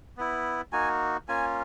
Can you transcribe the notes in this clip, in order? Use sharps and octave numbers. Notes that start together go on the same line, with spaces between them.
B3 E4
A#3 D#4 F#4 G#5
A#3 C#4 F4 G#5